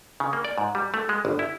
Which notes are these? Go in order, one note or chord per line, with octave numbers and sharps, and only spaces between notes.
C#3
A#3
D5
G#2
G3
A3
G#3
G1
E4